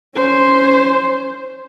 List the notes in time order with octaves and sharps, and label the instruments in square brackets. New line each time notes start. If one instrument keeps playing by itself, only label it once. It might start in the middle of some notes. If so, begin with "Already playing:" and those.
[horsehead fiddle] C#4 C5